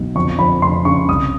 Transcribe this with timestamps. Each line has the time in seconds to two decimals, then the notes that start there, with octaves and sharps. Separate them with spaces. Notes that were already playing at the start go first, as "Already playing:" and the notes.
Already playing: B1
0.15 F2 C#6
0.39 F2 B5
0.62 F1 C6
0.85 C#3 C#6
1.08 C2 D#6